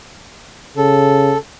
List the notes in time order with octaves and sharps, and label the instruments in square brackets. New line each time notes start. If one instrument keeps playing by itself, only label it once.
[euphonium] C#3 [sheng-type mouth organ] A4